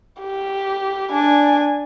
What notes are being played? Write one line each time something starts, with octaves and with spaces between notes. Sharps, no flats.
G4
D4 G#5